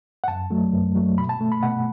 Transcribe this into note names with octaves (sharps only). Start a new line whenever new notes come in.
F#5
F#2 A5
F#3 A3
F#2
F#3 A3
B2 B5
A5
A3
B5
B2 F#5